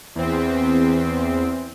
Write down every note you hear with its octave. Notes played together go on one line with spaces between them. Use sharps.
E2 C4